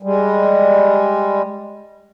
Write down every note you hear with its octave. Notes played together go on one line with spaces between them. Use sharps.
G3 G#3